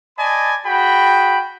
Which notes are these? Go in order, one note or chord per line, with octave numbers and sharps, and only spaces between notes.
D5 D#5 G#5 A5 B5
F#4 G#4 G5 B5